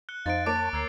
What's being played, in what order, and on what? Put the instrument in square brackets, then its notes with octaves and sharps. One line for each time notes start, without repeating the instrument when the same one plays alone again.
[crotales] F#6 C#7 G7
[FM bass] F2 [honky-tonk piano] D#4 C5 [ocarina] F5 [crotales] A6 D7
[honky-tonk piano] A#3 C#5 D7 [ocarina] A5 [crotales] D6 A6
[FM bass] D2 [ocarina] A#5 [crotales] E6 G#6 C7